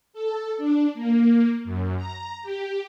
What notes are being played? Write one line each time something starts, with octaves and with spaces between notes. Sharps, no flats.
A4
D4
A#3
F#2
A#5
G4